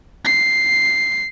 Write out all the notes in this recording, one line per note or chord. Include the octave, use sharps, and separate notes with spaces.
C7